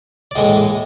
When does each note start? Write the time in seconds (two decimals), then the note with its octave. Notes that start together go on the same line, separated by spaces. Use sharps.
0.31 D5
0.36 A#1 A2 E3 G#3 D#5